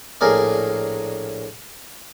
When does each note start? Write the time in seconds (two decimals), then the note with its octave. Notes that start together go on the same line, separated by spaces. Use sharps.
0.21 A#1 A2 G#4 A#4 D5